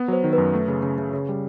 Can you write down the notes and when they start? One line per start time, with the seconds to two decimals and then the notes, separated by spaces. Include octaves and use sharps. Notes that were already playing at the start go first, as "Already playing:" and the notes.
Already playing: B3
0.08 F#3 C5
0.24 D#3
0.33 B4
0.38 F#2
0.54 A3
0.68 C#3
0.83 C#3
0.98 C#3
1.13 C#3
1.29 G3